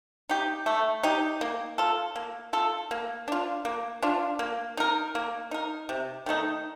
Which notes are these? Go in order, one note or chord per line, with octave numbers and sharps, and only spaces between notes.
D#4 G4
A3
D#4 G4
A#3
F4 A4
A#3
F4 A4
A#3
D4 F4
A#3
D4 F4
A#3
D#4 A#4
A#3
D#4 A#4
C3
D#3 A3 D#4